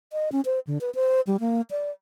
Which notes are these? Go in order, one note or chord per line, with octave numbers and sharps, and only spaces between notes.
D#5
C#4
C5
D3
B4
C5
G3
A#3
D5